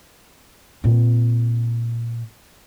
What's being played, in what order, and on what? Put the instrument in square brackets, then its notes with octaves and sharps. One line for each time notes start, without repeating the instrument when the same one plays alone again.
[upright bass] A#2 C4